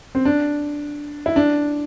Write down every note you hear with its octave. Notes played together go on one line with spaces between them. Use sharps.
C4
D4
E4
D4